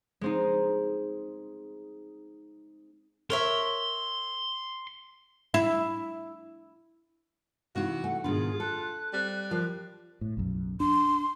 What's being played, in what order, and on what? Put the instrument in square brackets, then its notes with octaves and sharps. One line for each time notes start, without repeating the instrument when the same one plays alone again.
[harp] G#3 C4 D#4
[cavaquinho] A#4 C#5 E5 [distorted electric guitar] C6
[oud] E4
[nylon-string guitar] C3 E3 [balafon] G#3 D#4 E4 [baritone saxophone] F#4
[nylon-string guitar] A3 [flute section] F#5 [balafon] G#5
[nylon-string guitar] G#2 B2 D#3 [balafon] D4 [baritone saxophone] F4 [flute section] G#4
[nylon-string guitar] A4 [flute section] F#6
[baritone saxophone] G3 [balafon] C4 C5
[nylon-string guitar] F3 F5 [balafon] F4 A#4 A5
[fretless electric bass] A2
B1 F#2
[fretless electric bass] D4 [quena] C6